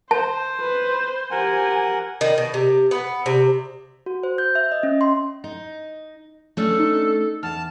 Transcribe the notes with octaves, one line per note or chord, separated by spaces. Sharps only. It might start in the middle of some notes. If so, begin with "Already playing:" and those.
C5 A5
B4
G4 A#4 F#5 G#5
D#3
B2
C3
B3
C3
F#4
C5
G6
E5
D#5
C#4
C6
D#4
A3 C#4 D4 A4
D#4
E2 A5 F6